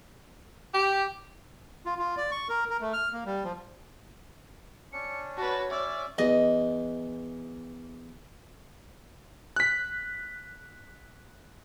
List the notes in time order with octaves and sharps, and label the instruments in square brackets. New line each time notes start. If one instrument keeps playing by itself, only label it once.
[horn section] G4
[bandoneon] F4
F4
D5
C#6
A#4
A#4
A3
F6
A#3
G3
F3
[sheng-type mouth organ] C#4 D4 [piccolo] C#7
[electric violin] F#4 B4 [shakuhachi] C#5 [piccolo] A5
[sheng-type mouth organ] C#4 [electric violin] D5 [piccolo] E5
[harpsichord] E2 [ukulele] D#5
[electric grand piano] F#6 B6